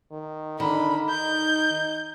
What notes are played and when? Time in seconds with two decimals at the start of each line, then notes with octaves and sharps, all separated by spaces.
0.11 D#3
0.60 D3 D#3 B5
1.10 D#4 G6